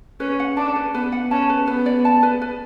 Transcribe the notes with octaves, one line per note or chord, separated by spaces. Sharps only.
C#4 B4
F#5
D4 A5
B4
B3 B4
F#5
C#4 A5
B4
B3 B4
D5
A5
B4
B4